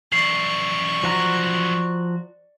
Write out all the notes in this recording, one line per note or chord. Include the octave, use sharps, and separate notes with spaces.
F#2 E3 D5 C#6 C7
F3 F#4 A#5